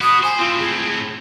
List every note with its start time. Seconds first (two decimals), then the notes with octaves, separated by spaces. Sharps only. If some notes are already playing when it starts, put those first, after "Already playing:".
0.01 F#4 B4 D#6
0.23 C5 G#5
0.39 A2 C4 F4
0.59 G#4